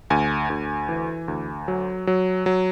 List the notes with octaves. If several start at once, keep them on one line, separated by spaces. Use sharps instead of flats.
D2 G#5
D2
E3
D2
F#3
F#3
F#3